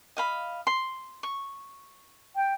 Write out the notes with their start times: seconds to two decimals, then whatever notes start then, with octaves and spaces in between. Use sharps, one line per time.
0.17 D#5 F5 B5
0.67 C6
1.23 C#6
2.36 G5